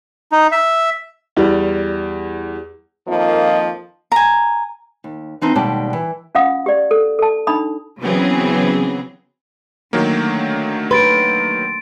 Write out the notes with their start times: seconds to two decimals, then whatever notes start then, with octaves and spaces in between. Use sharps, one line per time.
0.32 D#4
0.52 E5
1.36 E2 G3
3.06 F2 D#3 F3 A#3 D#5
4.12 G#5 A#5
5.04 D#2
5.41 E3 B3 C4 D4 D#4
5.55 D#2 B2 G3 G#3 D5 A5
5.93 E3
6.35 C#4 F4 F5 F#5 D#6
6.66 G4 D5
6.91 A4
7.19 A4 A5
7.47 D4 D#4 B5 D#6
8.03 C#3 E3 F#3 B3 C4 G#4
9.93 D3 D#3 F#3 A3 A#3
10.91 B4 C6 A6 D7